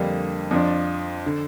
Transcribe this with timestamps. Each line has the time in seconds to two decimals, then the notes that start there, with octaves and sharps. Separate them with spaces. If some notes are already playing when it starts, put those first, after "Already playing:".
Already playing: F2 D3 G3 A#3 D4
0.51 F2 F3 D4
1.26 D3